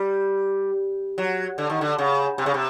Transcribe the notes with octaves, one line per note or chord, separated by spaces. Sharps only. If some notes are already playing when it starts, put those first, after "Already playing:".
Already playing: G3
F#3
D3
D#3
D3
C#3
C3
C#3
C3